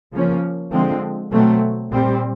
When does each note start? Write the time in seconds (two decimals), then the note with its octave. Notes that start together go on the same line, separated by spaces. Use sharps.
0.12 C#3 F3 A#3 C#4
0.72 D3 F3 G#3 C4
1.31 B2 F#3 A3 C4
1.90 A#2 G3 C4